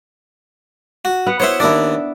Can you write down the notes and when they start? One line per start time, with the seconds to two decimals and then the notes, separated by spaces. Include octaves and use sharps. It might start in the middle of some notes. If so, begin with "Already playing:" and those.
1.05 F#4
1.26 B3 F#5
1.40 B3 E4 C5 C#5 E5
1.60 D#2 D4 E4 A#4 D5